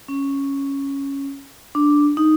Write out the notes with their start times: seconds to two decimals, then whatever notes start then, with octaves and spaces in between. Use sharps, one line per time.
0.09 C#4
1.75 D4
2.17 D#4